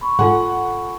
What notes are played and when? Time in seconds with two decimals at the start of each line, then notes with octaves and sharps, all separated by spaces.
0.01 B5 C#6
0.19 G#2 F4 A4 F#5 G#5 C6